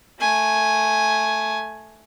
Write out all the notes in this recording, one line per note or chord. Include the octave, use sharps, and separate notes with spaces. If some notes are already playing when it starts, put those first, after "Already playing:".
A3 G#5